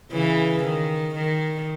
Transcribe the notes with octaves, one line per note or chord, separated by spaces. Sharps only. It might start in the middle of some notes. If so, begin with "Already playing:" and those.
C#3 E3
D#3
D#3